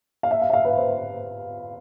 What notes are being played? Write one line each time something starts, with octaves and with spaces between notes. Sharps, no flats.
F5
E5
F5
E5
F5
B4
C5